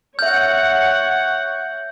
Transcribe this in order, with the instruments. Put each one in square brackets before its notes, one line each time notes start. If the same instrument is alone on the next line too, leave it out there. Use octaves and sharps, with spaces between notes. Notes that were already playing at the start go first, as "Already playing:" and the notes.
[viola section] C#5 F#5 [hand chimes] E5 F6 [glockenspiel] G6